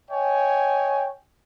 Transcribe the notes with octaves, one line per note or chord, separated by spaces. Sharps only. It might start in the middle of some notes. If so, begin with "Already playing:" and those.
C#5 D#5 G5 G#5